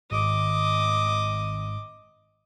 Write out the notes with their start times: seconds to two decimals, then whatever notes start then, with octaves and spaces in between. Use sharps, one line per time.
0.11 G#1 D#5 D6